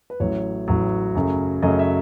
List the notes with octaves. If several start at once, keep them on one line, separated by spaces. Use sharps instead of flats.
B4
A1 A2 F#3 C#5
A1 A2 F#3
F#2 C#3 F#3 A3
F#2 C#3 F#3 A3 D#5
E5